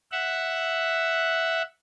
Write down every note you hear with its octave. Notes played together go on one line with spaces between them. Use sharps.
E5 F#5